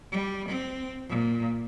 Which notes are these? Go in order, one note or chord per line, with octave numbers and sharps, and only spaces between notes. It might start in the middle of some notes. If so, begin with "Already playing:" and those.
G3
C4
A#2